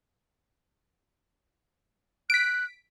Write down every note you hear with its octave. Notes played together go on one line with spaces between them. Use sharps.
F#6 B6 D7